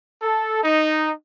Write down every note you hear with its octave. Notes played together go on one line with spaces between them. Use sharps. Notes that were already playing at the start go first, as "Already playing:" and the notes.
A4
D#4